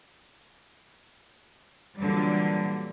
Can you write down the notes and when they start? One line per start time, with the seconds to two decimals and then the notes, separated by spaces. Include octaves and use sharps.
1.97 A#2 D3 E3 F#3 G3